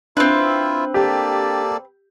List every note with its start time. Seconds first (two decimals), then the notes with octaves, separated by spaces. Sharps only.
0.17 C4 D4 E4 F4 B4 E5
0.94 A#3 G4 A4 D5